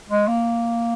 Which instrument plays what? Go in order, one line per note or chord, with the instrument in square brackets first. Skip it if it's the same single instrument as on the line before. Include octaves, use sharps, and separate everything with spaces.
[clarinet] G#3
A#3